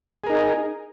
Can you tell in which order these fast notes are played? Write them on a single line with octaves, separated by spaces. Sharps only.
G#4 A#4 D#4